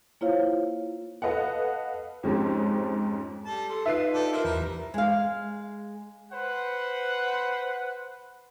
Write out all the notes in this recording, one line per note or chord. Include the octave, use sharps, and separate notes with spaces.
A#3 E4 F4 C5 C#5 F5
A4 B4 D#5 F5 F#5
F2 G#2 C#4 G4
G3 A4 A5
A4 C6
D#4 F4 B4 E5 C7
D4 G4 A4
A#4 C5 E5
E2 E3 G3 B4 E5 A#5
G#3 F5
B4 C5 F#5